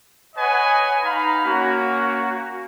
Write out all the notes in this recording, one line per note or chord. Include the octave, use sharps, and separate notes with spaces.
B4 C#5 D#5 F#5 G#5
D#4 F5 A#5 B5
A#3 C#4 F#4